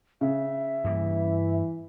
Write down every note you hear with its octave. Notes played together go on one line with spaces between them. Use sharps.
C#3 E5
G2 E3 G3 A#3